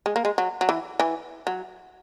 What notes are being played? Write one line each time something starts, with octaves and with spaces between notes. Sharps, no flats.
G#3
A#3
G#3
F#3
F#3
E3
E3
F#3